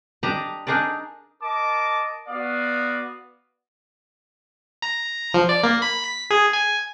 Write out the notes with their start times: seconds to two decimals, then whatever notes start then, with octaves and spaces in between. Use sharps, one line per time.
0.23 D4 G4 D5 D#5 A5 A#5
0.67 D4 D#4 G#4 A#4 D5
1.43 A#4 D#5 A5 D6
2.28 B3 F#4 D5 F5 D#6
4.82 A#5
5.34 F3
5.49 D5
5.63 A#3
5.82 B5
6.04 B6
6.30 G#4
6.53 G#5